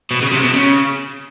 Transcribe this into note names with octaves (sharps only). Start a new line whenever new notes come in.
B2
C#3
C3
B2
C#3